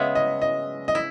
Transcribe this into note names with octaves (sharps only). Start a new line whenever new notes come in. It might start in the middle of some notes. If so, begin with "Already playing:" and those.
Already playing: C#3 G#3 B3 E5
D#5
D#5
D#5
E4